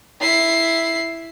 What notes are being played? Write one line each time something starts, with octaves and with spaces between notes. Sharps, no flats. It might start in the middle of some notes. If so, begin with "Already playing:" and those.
E4 C7